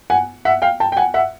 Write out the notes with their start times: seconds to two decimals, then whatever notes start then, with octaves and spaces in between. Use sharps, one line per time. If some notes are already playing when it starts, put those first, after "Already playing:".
0.10 F#5 G#5
0.45 E5 F#5
0.62 F5 G5
0.80 G5 A5
0.92 G5
0.97 F#5 G#5
1.14 E5 F#5